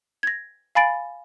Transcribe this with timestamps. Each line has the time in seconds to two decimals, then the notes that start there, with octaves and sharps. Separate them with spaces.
0.23 G#6 A#6
0.75 F5 G#5 B5 A6 D7